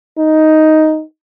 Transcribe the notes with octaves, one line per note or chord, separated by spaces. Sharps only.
D#4